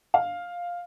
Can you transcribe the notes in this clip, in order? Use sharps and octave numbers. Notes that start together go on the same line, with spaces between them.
F5